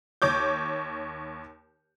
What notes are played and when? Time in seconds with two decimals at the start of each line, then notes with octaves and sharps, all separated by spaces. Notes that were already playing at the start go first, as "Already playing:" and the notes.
0.22 D#2 C#5 D6 G6